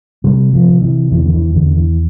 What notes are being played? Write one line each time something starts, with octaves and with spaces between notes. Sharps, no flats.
C3 G3
F3
C3
E3
E2 E3
D3
E3
E2 D3
E3